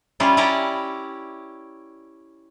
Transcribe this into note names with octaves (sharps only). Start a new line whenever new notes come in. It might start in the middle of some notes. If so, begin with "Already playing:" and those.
G3 C#4 E4 F4
C#4 E4 G4 D5 A#5